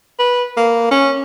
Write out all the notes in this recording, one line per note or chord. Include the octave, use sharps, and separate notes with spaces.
B4
A#3
C#4